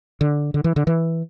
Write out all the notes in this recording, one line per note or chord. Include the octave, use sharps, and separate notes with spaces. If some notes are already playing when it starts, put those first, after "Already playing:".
D3
D3
E3
D3
E3